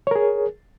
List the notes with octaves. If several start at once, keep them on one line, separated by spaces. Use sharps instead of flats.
G#4 A#4 C#5